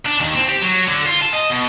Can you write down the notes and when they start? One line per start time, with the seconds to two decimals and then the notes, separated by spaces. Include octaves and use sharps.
0.06 D4
0.20 D#2
0.35 C4
0.49 G4
0.62 F#3
0.88 D3
1.06 F4
1.22 A5
1.34 D#5
1.51 B2